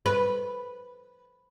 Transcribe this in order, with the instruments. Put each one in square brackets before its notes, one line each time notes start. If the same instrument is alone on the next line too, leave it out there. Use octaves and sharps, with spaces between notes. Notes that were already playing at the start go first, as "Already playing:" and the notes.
[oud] B4